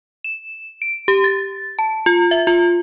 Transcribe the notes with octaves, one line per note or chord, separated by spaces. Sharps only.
E7
D7
G4
A6
A5
F4
E5
F4